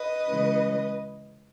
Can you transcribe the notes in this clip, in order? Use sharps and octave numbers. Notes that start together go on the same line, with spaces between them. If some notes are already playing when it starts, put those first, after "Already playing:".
Already playing: B4 D#5
C#3 E3 G#3 C#4